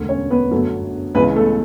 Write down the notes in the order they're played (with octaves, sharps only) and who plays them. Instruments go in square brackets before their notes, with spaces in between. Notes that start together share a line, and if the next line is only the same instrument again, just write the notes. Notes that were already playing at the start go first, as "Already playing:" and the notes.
Already playing: [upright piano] E1 D2 D3
C#4 C#5
B3 B4
G1 F#2 D3 F#3 A3
C#2 C#3 E3 B3 B4
A3 A4